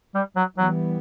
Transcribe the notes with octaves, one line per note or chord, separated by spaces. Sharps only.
G3
F#3
E3 F#3 G3 B3